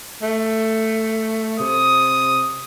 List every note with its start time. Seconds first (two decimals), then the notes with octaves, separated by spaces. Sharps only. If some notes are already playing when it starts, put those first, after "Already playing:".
0.23 A3
1.60 C3 D#6